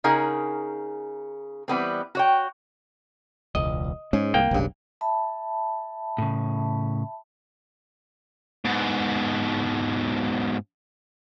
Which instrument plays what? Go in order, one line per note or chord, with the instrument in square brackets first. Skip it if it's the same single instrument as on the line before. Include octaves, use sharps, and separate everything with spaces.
[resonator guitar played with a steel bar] C#3 D#4 G#4 A#4 F#5 G#5
E3 G3 B3 C4
F#4 C#5 G5
[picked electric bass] E1 C#2 [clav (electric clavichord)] D#5
[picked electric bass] G#2 [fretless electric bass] G#3 C#4
[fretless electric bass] C2 [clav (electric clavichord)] A#3 G5
[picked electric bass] F1 G2 [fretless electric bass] B1 C#3
[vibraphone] E5 A5 B5
[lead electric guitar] A2 C#3
[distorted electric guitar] G#2 B2